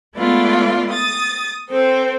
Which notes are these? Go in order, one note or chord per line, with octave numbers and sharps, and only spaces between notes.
G#3 A3 B3 E4 F4 D5
D#6 A6
C4 A4 C5